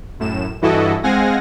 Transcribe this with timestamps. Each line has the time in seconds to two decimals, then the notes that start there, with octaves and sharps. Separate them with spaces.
0.20 F#2 A2 E7
0.62 G2 E3 E4 F#4 A4 D#5
1.03 G#3 C4 F5 F#5 G#5 A#6